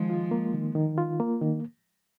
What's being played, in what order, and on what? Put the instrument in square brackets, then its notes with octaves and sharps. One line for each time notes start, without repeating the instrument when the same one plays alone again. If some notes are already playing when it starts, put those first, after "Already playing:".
Already playing: [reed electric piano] D#3 [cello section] F3 G#3
[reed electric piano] F4
A#3
D#3
D#3
F4
A#3
D#3